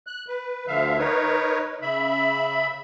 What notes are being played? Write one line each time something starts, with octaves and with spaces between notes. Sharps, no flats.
F#6
B4
D2 D3 F3 E5 F5
D#4 A#4 B4 C#5
C#3 E5 B5